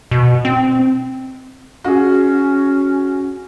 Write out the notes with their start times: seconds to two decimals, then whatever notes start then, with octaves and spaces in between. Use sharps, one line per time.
0.11 B2
0.45 C4
1.84 C#4 F#4 G#4